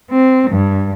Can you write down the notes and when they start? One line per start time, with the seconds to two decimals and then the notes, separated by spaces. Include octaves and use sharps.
0.11 C4
0.51 G2